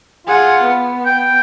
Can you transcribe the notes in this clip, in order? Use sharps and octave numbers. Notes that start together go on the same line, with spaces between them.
F4 G#4 F#5
B3
G5